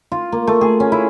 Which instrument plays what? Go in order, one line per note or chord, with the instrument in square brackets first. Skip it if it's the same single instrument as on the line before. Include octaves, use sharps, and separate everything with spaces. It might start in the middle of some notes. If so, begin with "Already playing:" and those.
[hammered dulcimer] F4
A#3
A3
G#4
C#4
E4